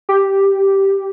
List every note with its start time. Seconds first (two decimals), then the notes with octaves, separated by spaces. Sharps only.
0.09 G4